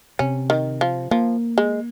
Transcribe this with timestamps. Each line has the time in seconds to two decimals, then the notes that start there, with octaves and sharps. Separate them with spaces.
0.19 C3 C#4
0.50 D#3
0.81 F3
1.11 F3 A#3
1.58 G#3